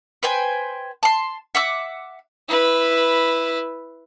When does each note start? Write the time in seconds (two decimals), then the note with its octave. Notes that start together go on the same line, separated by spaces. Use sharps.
0.23 B4 C5 G5 G#5
1.03 A5 C6
1.55 E5 F#5 D6 E6
2.49 E4 B4